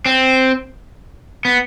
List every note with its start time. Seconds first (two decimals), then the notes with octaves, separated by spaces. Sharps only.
0.06 C4
1.45 B3